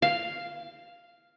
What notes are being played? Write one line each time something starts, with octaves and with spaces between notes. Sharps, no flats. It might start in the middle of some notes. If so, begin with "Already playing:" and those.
F5